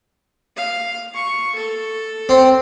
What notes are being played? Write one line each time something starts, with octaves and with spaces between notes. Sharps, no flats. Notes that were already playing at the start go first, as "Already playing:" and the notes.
F5
C#6
A4
C4